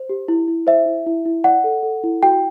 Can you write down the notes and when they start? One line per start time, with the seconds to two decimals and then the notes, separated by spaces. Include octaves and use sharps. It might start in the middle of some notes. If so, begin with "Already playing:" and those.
Already playing: C5
0.09 G4
0.28 E4
0.48 E4
0.67 C5 E5
0.86 E4
1.06 E4
1.26 E4
1.44 D5 F#5
1.64 A4
1.83 A4
2.03 E4
2.23 F#4 G5